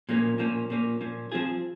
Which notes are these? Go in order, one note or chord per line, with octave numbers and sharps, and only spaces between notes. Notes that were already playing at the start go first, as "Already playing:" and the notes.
A#2 F3 A#3 C#4
A#2 F3 A#3 C#4
A#2 F3 A#3 C#4
A#2 F3 A#3 C#4
F3 C4 F4 G#4